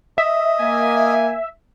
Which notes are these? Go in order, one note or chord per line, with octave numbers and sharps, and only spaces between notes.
D#5 E5
A#3 G#5